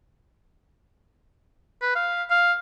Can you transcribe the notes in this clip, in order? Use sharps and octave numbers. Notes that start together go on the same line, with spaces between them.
B4
F5
F5